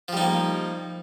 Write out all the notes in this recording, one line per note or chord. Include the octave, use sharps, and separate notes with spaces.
F3 G3 A#3 D#4